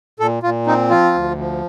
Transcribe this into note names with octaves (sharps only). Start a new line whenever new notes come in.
A#2 A4
A#2 F4
C4 D#4
F3 F4
D2
F3